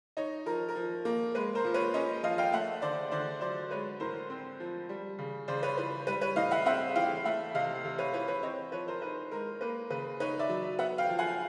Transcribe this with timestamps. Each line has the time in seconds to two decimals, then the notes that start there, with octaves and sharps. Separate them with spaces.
0.17 D#4 C#5 D#5
0.46 F3 A#4
0.69 A#4
0.76 F3
1.05 A#3
1.35 G#3 B4
1.55 A#4 C5
1.64 A#2
1.74 B4 C#5
1.94 C#4 C#5 D#5
2.23 F3 D#5 F5
2.38 F5 G5
2.52 A3 E5 F#5
2.82 D3 C5 D5
3.11 D3 C5 D5
3.41 F#3 C5 D5
3.71 G#3 B4 C#5
4.00 A2 A#4 C5
4.30 C4
4.60 F3
4.89 G3
5.19 C#3
5.48 C#3 C5 D5
5.63 B4 C#5
5.78 E3 B4
6.07 G3 B4
6.21 B4 C#5
6.36 A2 D#5 F5
6.51 E5 F#5
6.65 C4 E5 F#5
6.96 E3 F5 G5
7.24 A3 E5 F#5
7.54 C3 D#5 F5
7.85 C3
7.98 B4 C#5
8.13 E3 B4 C#5
8.28 B4 C#5
8.43 C4 C#5 D#5
8.72 F3 B4 C#5
8.88 A#4 C5
9.02 D#4 B4
9.31 G#3 A#4
9.61 A#3 B4
9.90 C#3 B4
10.20 D#4 B4 C#5
10.39 D5 E5
10.49 F#3
10.79 B3 E5 F#5
10.98 F5 G5
11.09 F3
11.19 F#5 G#5